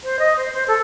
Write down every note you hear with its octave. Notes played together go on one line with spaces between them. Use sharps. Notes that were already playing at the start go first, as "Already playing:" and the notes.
C5
D#5
C5
C5
A4